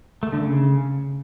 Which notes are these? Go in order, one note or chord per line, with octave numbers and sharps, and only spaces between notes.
A3
D3
C#3